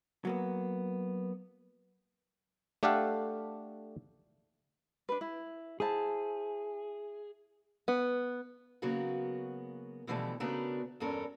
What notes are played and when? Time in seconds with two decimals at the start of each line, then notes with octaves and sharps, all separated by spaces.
0.25 F#3 A#3 B3
2.83 A3 D4 G4 A4 F5 F#5
5.09 D4 B4
5.21 E4
5.80 E4 G#4 C5 A5
7.88 B3
8.82 C#3 F#3 A#3 B3 F#4
10.07 B2 D3 E3 F3 G3 A3
10.40 C#3 A3 B3 D4 F#4 A#4
11.00 E2 G2 C#4 A4 A#4